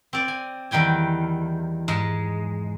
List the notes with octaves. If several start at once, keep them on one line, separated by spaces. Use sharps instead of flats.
C4 D5
G#5
E2 D#3 G3 G5 G#5
G#2 G#3